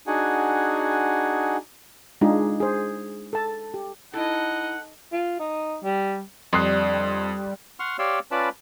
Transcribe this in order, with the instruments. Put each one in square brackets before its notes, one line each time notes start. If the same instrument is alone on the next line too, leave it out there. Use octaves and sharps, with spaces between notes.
[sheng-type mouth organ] D4 D#4 F#4 G#4 F#5 G#5
[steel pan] G#3 D4 D#4 F4 G#4
G#4 C5
A4 A5
G4
[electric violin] D#4 D#5 [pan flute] E4 [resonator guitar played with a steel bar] A4 [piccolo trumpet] F#5
[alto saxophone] F4
D#4
G3
[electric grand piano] F2 F#6 [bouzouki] D3 [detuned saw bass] G3 [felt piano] C6 D#6 C7
[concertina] F#5 C6 C#6 F6
G4 C#5 D5 F5 C6 E6
C#4 F4 B4 D5 A5 B5